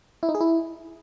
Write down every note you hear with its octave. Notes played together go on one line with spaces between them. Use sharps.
E4
D#4
G#4
E4